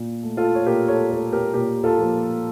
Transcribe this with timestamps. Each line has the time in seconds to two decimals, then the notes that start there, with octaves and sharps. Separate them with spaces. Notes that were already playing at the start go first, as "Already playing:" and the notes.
Already playing: A#2
0.23 A3
0.37 F4 A4
0.55 C#5
0.66 A#2 G4 A#4
0.88 A4 C#5
1.10 A3 A4 C#5
1.32 G4 A#4
1.54 A#2 G4 A#4
1.84 F4 A4
1.98 F3 A#3